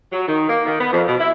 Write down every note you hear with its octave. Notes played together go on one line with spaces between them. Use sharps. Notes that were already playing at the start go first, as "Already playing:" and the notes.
F#3
D#3
A#3
D#3
B3
F2
B2
E4